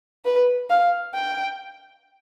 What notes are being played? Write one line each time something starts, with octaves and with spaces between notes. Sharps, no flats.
B4
F5
G5